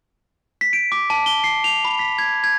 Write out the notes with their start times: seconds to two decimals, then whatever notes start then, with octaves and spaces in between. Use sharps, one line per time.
0.61 B6
0.73 D7
0.92 D6
1.10 A5
1.26 G7
1.44 C7
1.64 F7
1.85 B5
1.99 B6
2.18 G#6
2.44 G#6